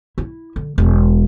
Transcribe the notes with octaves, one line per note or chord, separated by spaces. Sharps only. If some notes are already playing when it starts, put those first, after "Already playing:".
E4
D3
E1